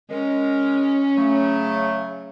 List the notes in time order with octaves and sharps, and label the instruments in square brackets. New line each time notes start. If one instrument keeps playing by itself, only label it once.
[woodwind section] G#3 A#4 [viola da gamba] C#4
[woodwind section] C#3 F#3 A3